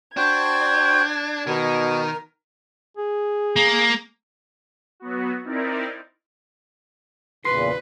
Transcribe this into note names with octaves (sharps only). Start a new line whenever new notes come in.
D4 F#4 C5 G5 G#6
B2 D#3 A#4
G#4
A#3
F#3 B3 F#4
C4 D#4 E4 A#4 D5
E2 A#2 C#3 B4 C6